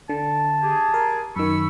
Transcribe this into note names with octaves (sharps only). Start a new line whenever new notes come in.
D3 A5
G4 G#4
A#4
F#2 D#3 B5 C#6 E6